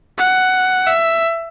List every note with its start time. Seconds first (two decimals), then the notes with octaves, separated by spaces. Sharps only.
0.18 F#5
0.87 E5